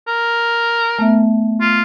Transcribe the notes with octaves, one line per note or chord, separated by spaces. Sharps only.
A#4
A3 B3 E5
F4